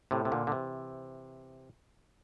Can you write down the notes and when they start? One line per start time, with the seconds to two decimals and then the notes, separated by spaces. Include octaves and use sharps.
0.11 A2 C3
0.25 C3
0.32 A#2 D3
0.47 D3
0.52 C3 E3